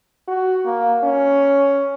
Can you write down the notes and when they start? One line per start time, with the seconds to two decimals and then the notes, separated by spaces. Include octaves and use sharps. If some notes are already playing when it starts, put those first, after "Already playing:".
0.28 F#4
0.65 A#3
1.03 C#4